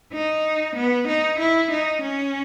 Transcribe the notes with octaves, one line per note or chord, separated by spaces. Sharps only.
D#4
B3
D#4
E4
D#4
C#4